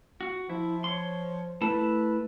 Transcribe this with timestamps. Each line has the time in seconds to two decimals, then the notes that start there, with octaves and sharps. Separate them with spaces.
0.21 F#4
0.49 F3 E4
0.84 C#5 C6
1.61 A3 E4 B4 A5